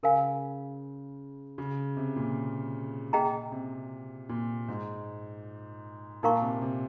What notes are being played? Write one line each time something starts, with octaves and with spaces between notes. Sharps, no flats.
C#3 A#4 F5 G#5
C#3
C3
A#2
A#2 C#4 G#4 D#5 G5 A#5
C3
A#2
G#2
A#2 D#4 A#4 F5 A#5 C#6
C3
C3